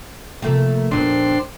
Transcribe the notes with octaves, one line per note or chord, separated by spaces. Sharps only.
C3 F3 A3 A#3
F2 A#2 D#3 B3 D4 C6